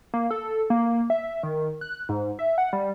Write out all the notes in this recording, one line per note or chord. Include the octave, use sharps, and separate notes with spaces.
A#3
A4
A#3
E5
D#3
F#6
G#2
E5
F#5
G3